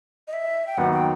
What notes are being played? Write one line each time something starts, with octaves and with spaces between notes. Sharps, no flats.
D#5
E5
G5
D#2 D#3 F#3 B3 F#5
G5